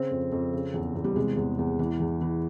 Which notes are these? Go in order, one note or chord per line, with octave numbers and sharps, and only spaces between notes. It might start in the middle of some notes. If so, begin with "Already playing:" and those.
Already playing: C#3 C4
F2
F2
C#3
E2
E2
G3
C3 G#3
E2
E2
E3
E2
E3